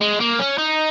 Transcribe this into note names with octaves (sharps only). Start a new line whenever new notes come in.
G#3
A#3
C#4
D#4